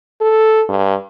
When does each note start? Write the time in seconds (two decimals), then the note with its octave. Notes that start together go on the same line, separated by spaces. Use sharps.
0.21 A4
0.69 G2